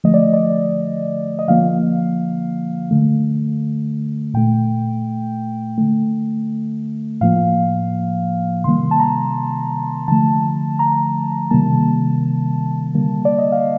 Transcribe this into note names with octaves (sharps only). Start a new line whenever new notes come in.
D3 F3 A3 D#5
D5
D5
D#5
D3 F3 A#3 F5
D3 A3
A#2 A3 G5
D3 A3
A2 F3 A#3 F5
C3 D#3 G3 A#3 C6
A5
A#5
D3 F3 A3 A5
A#5
C3 D#3 G3 A#3 A5
D3 G3 A#3
D5
D#5
F5